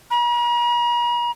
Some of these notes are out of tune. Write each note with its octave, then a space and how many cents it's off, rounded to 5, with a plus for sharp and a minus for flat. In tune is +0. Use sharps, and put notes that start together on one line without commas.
A#5 +45